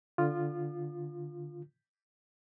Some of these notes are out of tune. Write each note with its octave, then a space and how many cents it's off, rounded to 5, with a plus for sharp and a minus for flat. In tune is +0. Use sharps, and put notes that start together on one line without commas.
D3 +0 F4 +0 D#6 -45